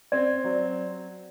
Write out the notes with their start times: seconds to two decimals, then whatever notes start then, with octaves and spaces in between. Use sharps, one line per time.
0.12 C4 D5
0.44 F#3